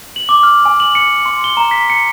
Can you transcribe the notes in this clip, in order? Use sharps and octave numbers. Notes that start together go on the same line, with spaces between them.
F#7
D6
F6
G#5
F#7
C#7
C6
G7
A#5
B6
C#7